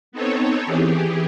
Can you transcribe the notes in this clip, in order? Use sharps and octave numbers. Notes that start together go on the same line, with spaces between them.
B3 C4 D#4 A4 C#5
E3 G4 G#4